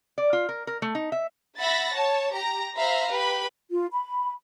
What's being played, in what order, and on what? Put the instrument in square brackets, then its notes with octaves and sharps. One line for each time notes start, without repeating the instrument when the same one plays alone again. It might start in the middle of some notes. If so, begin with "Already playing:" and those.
[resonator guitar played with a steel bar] D5
F4
A#4
A#4
A3
D#4
E5
[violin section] E5 F#5 B5 A6 A#6
C#5 A5
G4 A#5
C5 E5 F5 A#5 B5
G4 B4 B5
[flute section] F4
B5